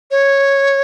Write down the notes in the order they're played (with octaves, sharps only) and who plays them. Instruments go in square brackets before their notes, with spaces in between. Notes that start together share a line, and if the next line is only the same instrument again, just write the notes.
[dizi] C#5